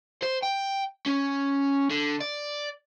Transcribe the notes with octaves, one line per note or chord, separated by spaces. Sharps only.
C5
G5
C#4
D3
D5